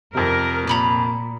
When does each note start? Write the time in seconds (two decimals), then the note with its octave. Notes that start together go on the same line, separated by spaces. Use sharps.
0.14 F2 C3 A#4
0.67 A#2 A#5 B5 D6